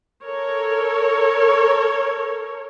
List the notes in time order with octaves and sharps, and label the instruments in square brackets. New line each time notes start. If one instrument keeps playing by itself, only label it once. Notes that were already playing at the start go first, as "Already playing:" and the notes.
[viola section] A4 A#4 C#5